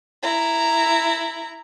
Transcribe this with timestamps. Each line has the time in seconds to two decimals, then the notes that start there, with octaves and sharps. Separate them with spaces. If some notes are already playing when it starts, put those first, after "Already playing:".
0.23 E4 A#5